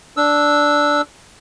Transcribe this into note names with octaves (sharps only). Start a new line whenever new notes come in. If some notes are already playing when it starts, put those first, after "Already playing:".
D4 E6